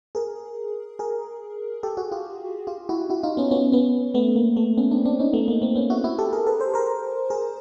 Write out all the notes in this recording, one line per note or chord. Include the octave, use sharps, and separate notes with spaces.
G#4 A#4
G#4 A#4
G4 A4
F#4 G#4
F4 G4
F4 G4
E4 F#4
E4 F#4
D#4 F4
B3 C#4
B3 C#4
B3 C#4
A3 B3
A#3
A3 B3
B3 C#4
C4 D4
C4 D4
C#4 D#4
A3 B3
A#3
A#3 C4
B3 C#4
E4 F#4
E4 F#4
G4 A4
G#4 A#4
A4 B4
A#4 C5
A#4 C5
G#4 A#4